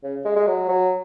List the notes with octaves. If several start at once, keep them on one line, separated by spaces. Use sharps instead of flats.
C#3
G#3
G#3
F#3
F#3